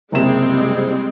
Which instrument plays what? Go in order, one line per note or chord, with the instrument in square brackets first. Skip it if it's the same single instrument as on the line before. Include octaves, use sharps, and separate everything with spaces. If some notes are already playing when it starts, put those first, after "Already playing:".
[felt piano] F#1 C3 E7 [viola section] G3 G#3 C4 [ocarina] E4